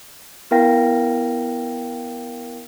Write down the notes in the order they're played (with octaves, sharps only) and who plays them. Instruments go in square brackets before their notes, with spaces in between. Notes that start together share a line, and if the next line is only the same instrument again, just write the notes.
[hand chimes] B3 E4 A#4 F5 G5 A#6